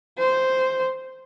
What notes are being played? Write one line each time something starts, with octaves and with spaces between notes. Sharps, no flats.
C5